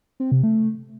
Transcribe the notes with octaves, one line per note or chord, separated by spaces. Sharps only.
C4
C3
A3